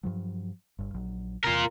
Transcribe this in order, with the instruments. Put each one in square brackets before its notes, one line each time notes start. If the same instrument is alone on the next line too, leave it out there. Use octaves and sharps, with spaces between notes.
[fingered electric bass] G2 F3 F#3
G1 G2
A#1 F#3
[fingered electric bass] E2 C3 [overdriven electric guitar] F4 A#4